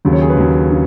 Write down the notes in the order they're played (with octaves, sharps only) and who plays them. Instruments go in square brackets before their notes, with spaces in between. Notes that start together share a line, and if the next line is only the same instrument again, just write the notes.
[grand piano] D#2 C#3 F#3
C#5
G#4
B4
D#2 C#3 F#3
C#3